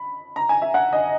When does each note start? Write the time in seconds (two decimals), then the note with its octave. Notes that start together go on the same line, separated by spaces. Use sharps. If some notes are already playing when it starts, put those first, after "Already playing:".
Already playing: B5
0.36 A#5
0.49 G#5
0.62 E5
0.74 F#5
0.93 D#5